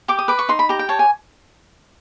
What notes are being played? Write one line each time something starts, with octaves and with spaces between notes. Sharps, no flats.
G4 D6
D#6
B4 D6
C#6
D#4 C6
B5
G4 A#5
G5
C#5 A5
G#5